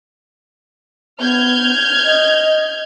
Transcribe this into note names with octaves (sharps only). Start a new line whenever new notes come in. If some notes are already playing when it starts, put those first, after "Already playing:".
B3 F6 G6 G#6
D#5